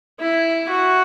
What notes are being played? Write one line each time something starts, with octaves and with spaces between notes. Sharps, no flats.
E4
F#4